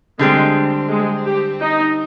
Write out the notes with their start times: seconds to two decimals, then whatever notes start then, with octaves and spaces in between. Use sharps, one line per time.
0.19 D3 G3 G#3 C4
0.90 G#3
1.26 G4
1.60 D#4